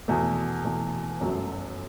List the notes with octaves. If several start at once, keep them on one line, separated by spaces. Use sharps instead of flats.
E2 B2 A3
E2 B2 A3
G1 F#2 F#3 A3